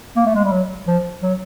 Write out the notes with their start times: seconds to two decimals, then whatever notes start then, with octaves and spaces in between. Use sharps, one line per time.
0.16 A#3
0.26 A3
0.35 G#3
0.44 G3
0.52 F#3
0.87 F3
1.22 F#3